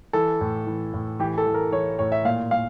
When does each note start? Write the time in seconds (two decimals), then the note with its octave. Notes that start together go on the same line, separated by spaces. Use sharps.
0.13 E3 A4
0.41 A2
0.67 E3
0.94 A2
1.19 E3 G4
1.38 A4
1.47 E3
1.54 A#4
1.72 E3 C#5
1.99 A2 C#5
2.12 E5
2.25 A#2 F5
2.51 A#2 F5